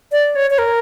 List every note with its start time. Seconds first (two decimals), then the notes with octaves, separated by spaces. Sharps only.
0.12 D5
0.36 C#5
0.51 C#5
0.58 A#4